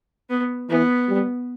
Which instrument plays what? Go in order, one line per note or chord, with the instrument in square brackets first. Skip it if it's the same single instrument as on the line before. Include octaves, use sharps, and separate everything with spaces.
[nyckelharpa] B3
[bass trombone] E3 [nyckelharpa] B3
[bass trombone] G3